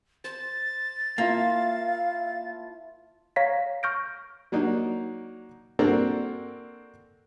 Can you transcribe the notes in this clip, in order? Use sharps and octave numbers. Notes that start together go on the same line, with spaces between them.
C5 A6
A#3 E4 F4 F5 A5
C#5 F5 A#5 A#6 B6
C#6 F6 G6 A#6 D7
F#3 A#3 D4 D#4
A#3 C4 D4 F#4 A4 A#4